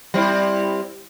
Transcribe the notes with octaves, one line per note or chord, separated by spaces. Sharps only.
G3 C4 E4